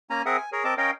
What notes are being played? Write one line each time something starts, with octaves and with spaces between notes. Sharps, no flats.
A#3 C#4 G#5 A#5
C4 G#4 A#4 E5 F#5 D#6
G#5
G#4 A#4 C#5
C4 A#4 D#5 A5 D6
C#4 A#4 C#5 D#5 F5 G5